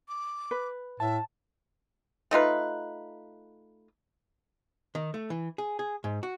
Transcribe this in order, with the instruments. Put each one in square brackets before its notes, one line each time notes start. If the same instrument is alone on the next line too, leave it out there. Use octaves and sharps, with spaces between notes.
[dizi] D6
[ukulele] B4
[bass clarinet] A2 [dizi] E5 [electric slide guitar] A5
[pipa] A3 D#4 F4 B4
[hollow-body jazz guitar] D#3
A3
E3
G#4
G#4
G#2
F#4